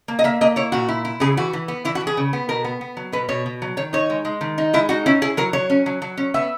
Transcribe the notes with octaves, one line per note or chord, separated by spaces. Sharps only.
A#3
D#5
A#3 E5
A#3 D#5
E4 C#5
A#2 F#4
E4
E4
C#3 G#4
E3 F#4
E3
B3
E3 E4
F#4
E3
G#4
C#3
B3
B2 A#4
B3
B3
F#3
B2 B4
B2 C#5
B2
F#3
D#3 C#5
D#4 C#5
G#3
G#3
D#3
D#4
G#3 E4
D#4 F#4
C#4 E4
E4 G#4
F#3 A#4
F#3 C#5
C#4
F#3
F#3
C#4
B3 E5